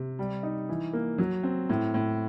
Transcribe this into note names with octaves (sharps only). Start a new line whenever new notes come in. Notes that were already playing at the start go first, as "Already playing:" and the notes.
Already playing: C3
G3
D#4
E3
A#3
F#3
C4
A2
A2